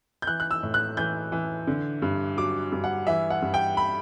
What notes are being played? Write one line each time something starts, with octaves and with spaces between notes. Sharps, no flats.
G6
E3 F#6
F#6
E6
A2
F#6
E3 G6
E3
D3
G2
F#3 D6
G2
F#5
E3 E5
F#5
G2
G5
B5